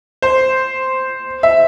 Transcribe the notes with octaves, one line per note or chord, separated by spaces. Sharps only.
C5
E5